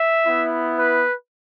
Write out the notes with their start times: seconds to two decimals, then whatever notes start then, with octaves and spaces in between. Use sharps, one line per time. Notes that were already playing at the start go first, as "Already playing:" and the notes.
Already playing: E5
0.26 B3 E4
0.76 B4